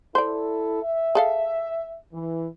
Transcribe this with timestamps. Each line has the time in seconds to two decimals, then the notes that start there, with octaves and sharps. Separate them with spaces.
0.15 E4 A4 C5 D5
0.83 E5
1.15 G#4 A4 F5
2.13 E3